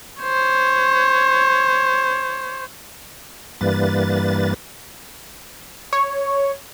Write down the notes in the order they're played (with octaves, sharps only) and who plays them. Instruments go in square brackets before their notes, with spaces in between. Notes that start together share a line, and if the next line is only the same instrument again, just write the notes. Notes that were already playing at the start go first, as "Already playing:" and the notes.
[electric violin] C5 C#5
[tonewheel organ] G2 E3 G3 A#3 B4 A6
[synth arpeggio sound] C#5